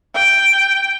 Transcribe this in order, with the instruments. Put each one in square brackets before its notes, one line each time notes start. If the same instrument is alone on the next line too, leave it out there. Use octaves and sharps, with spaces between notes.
[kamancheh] G5